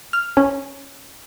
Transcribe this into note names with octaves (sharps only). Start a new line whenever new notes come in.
F6
C#4